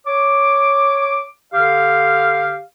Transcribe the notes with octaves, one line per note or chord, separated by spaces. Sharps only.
C#5 D6
D3 G4 F5